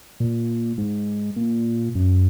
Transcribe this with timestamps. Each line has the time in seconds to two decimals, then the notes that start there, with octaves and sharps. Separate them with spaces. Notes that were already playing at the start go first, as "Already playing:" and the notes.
0.20 A#2
0.78 G#2
1.36 A#2
1.95 F#2